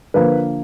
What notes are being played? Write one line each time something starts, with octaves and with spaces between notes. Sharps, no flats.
D3 F3 A#3 B4